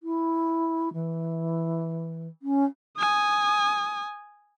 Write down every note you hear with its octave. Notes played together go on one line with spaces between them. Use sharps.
E4
E3
C#4
G#5 D#6